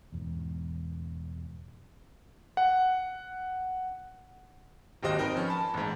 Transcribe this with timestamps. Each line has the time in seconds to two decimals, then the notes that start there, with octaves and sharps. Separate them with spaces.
0.12 E1 E2 G#2
2.57 F#5
5.03 D1 G#1 D#2 G4 C5 D#5
5.18 C4 D#4 A#4 B4
5.36 F3 C#4
5.48 A5 B5
5.74 A1 G#2